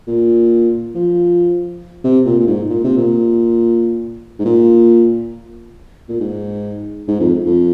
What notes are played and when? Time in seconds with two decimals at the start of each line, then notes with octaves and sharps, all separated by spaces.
0.07 A#2
0.95 F3
2.04 C3
2.25 A#2
2.40 A#2
2.47 G#2
2.70 A#2
2.84 C3
2.97 A#2
4.39 G#2
4.45 A#2
6.09 A#2
6.20 G#2
7.08 G#2
7.20 F2
7.46 F2